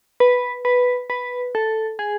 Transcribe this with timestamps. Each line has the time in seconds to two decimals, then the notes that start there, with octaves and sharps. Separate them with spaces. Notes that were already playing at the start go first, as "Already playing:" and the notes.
0.20 B4
0.65 B4
1.10 B4
1.55 A4
1.99 G#4